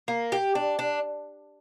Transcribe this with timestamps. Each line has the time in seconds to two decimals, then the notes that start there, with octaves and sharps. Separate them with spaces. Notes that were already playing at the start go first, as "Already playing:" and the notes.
0.08 A#3
0.32 G4
0.55 D4
0.79 D4